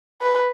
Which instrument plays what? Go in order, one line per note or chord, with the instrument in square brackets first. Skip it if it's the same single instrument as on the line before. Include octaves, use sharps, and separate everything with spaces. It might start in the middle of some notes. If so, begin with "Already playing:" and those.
[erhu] B4